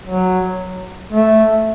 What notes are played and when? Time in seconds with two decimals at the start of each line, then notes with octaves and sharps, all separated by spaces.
0.07 F#3
1.12 A3